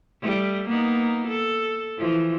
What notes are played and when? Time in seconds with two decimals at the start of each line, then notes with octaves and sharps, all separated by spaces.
0.21 G3 A3
0.68 A#3 B3 D#4
1.27 A4
1.98 E3 F3